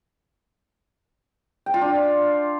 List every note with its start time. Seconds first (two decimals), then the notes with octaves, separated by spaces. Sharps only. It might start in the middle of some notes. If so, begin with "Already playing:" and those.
1.66 G5
1.74 F4
1.81 D4